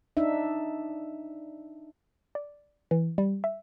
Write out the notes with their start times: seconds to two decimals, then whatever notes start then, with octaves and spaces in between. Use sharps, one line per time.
0.17 D4 D#4 E5
2.35 D5
2.91 E3
3.18 G3
3.44 E5